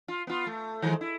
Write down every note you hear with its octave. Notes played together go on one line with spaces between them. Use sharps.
F4
B3 F4
A3
D#3 F3 G#3
E4